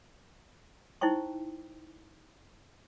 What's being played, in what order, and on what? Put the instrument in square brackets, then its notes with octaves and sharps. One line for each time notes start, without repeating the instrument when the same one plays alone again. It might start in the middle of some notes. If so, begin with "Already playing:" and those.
[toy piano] D#4 E4 C5 G5 C#6